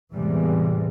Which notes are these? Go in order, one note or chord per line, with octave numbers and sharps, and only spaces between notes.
E2 A2 C3 E3 G3 G#3